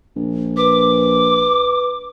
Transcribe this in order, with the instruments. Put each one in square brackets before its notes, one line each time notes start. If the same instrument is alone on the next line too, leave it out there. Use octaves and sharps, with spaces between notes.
[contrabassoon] A#1
[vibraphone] B4 [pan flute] D6